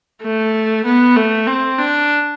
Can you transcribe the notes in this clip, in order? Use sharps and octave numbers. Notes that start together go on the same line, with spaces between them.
A3
B3
A3
C4
D4